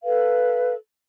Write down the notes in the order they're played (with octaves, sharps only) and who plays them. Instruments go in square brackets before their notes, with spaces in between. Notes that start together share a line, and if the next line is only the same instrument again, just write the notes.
[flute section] A4 B4 F5